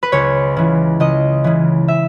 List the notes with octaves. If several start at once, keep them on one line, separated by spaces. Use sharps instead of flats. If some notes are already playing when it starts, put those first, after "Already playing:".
B4
C#2 C#5
C#3 E3
C#2 D#5
C#3 E3
E5